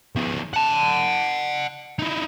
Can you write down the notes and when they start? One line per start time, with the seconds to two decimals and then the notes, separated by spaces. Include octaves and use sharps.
0.16 F3 B3
0.53 F#5 A5
1.99 D#4 E4